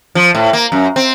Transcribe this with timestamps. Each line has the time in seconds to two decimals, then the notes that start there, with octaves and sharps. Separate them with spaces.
0.15 F3
0.35 A2
0.53 A#3
0.72 F#2
0.96 C4